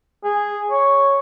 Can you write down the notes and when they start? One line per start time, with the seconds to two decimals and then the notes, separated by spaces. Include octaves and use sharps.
0.24 G#4
0.71 C#5